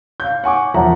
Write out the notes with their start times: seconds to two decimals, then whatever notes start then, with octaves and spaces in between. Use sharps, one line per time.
0.20 F5 G6
0.44 F#5 G#5 C#6 D6
0.74 E1 F3 E5 F#5 A#5